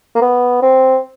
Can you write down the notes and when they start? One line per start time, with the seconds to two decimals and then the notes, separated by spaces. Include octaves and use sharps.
0.15 A#3
0.21 B3
0.62 C4